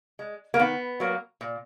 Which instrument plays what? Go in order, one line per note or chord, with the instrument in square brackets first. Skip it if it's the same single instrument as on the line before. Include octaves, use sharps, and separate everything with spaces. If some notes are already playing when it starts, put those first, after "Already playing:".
[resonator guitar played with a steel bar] G#3
A#3
D#3 B3
F#3 A#3
A#2